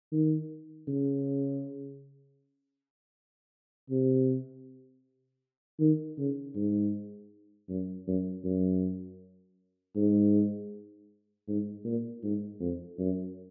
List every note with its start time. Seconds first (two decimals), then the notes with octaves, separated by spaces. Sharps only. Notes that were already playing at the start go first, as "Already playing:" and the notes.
0.12 D#3
0.87 C#3
3.90 C3
5.80 D#3
6.18 C#3
6.55 G#2
7.69 F#2
8.07 F#2
8.44 F#2
9.96 G#2
11.47 G#2
11.85 A#2
12.23 G#2
12.60 F2
12.99 F#2